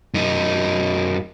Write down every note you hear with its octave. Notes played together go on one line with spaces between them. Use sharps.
F#2 D#4